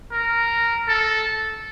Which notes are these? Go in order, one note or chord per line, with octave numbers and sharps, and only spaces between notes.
A#4
A4